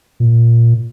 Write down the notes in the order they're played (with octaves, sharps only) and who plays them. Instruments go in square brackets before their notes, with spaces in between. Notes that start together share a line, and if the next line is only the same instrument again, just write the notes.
[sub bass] A#2